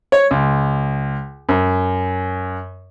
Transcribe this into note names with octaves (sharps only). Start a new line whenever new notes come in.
C#5
C#2
F#2